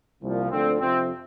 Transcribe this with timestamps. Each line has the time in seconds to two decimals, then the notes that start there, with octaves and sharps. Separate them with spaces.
0.21 C2 A#2 F3
0.50 D2 D3 F3 C4
0.80 F2 C3 F3 C4